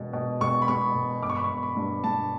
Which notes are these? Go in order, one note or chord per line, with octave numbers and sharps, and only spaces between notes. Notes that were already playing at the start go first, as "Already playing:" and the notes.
Already playing: E1 B2
B2
E1 C#6
B5
E1 C#6
E1
G1 D6
C#6
B5
G1 C#6
B5
G2
G2 A5